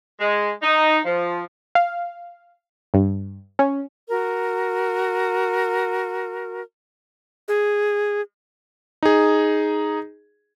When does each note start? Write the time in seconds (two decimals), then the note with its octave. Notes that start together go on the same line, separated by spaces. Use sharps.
0.20 G#3
0.62 D#4
1.05 F3
1.75 F5
2.94 G2
3.59 C#4
4.09 F#4 A#4
7.48 G#4
9.03 D#4 G#4